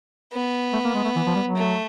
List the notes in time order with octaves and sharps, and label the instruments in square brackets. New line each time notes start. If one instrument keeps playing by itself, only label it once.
[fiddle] B3
[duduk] A3
A#3
G#3
A3
E3
F3
G3
F#3
[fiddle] A3